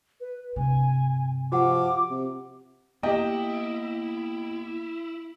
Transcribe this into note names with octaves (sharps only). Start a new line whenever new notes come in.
B4
G2 C3 G#5
F3 F#4 G4 F#5 D6
C3
A#3 B3 E4 G4 D#5 G5